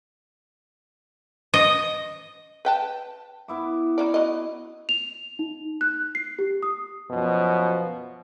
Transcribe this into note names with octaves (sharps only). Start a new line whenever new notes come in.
D#5
B4 G5 A5
B3 E4 D6
C#4 D#4 D5
F#3 D#5
F7
D#4
F#6
C7
G4
D#6
F#2 B2 F3